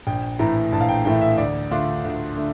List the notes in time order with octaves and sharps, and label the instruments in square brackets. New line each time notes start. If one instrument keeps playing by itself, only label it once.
[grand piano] A#1 G5
A2 E3 A3 A#5
A#1 A5
F5
G5
A2 E3 A3 G5
E5
D2 D5
D3 A3 D4 F4
D2
D3 A3